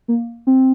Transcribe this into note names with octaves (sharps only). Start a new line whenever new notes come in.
A#3
C4